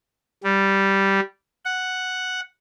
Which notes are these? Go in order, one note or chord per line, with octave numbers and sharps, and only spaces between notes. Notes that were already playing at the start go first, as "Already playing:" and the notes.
G3
F#5